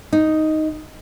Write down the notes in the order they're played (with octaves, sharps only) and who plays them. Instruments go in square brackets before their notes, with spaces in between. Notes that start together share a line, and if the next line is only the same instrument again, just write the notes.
[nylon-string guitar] D#4